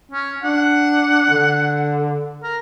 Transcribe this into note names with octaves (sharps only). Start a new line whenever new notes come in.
C#4
D4 F#5
D3
A#4